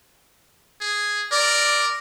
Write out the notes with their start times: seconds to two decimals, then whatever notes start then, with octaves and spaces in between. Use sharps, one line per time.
0.81 G#4
1.32 A#4 D5